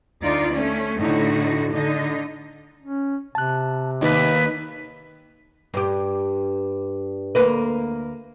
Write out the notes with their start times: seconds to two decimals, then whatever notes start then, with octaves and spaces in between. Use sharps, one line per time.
0.22 D2 D#4 F4 D5
0.52 A3 C#4
0.98 A2 D3 D#4 F#4
1.71 D3 D#4 D#5
2.82 C#4
3.35 C3 A5 F#6
4.02 D#2 D#4 B4
5.74 G2 G4
7.35 D2 A#3 B4